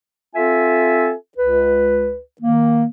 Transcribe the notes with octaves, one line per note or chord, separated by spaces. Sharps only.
C4 F4 A4 E5 G#5
C#2 B4
D#3 A#3